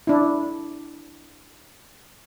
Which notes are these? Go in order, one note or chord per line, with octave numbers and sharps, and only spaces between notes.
D4 E4